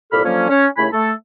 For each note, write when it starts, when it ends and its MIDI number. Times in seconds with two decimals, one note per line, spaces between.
0.12 0.24 36
0.12 0.24 46
0.12 0.24 67
0.12 0.24 69
0.12 0.24 83
0.12 0.24 89
0.24 0.46 50
0.24 0.46 53
0.24 0.46 54
0.24 0.46 58
0.24 0.46 61
0.49 0.67 61
0.77 0.87 39
0.77 0.87 49
0.77 0.87 57
0.77 0.87 64
0.77 0.87 80
0.77 0.87 83
0.93 1.12 57
0.93 1.12 69